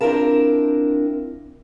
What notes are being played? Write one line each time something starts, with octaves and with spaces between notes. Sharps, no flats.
C4 D4 E4 F4 A#4 A5